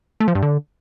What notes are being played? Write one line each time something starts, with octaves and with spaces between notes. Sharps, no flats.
A3
F3
G2
D3